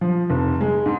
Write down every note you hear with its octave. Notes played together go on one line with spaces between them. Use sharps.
F3
F1
G#3
G#2